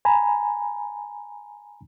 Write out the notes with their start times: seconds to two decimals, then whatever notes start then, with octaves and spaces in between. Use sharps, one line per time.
0.05 G#5 A#5 B5